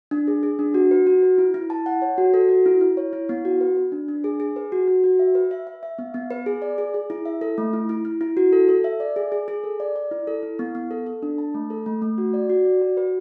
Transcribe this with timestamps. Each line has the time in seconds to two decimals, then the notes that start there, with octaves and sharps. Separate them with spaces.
0.11 D4
0.28 G#4
0.43 G#4
0.59 D4
0.74 F#4
0.91 B4
1.07 F#4
1.23 B4
1.38 E4
1.54 E4
1.70 A5
1.86 F#5
2.02 C#5
2.18 F#4
2.34 A4
2.49 F#4
2.66 E4
2.81 E4
2.97 C#5
3.13 E4
3.29 B3
3.45 F#4
3.61 B4
3.77 B4
3.92 D4
4.08 D4
4.24 G#4
4.40 G#4
4.56 B4
4.72 F#4
4.88 F#4
5.04 F#4
5.19 E5
5.35 B4
5.51 E5
5.67 E5
5.83 E5
5.98 B3
6.14 B3
6.31 B4
6.46 G#4
6.62 D5
6.78 G#4
6.94 G#4
7.10 E4
7.26 E5
7.41 A4
7.58 A3
7.73 E4
7.89 E4
8.05 E4
8.21 E4
8.37 F#4
8.53 A4
8.69 A4
8.84 E5
9.00 D5
9.16 G#4
9.32 G#4
9.48 G#4
9.63 A4
9.80 D5
9.96 D5
10.11 E4
10.27 A4
10.43 E4
10.59 B3
10.75 B3
10.91 A4
11.06 A4
11.23 D4
11.38 A5
11.54 A3
11.70 A4
11.86 A3
12.02 A3
12.18 F#4
12.34 D5
12.50 F#4
12.65 D5
12.82 F#4
12.97 B4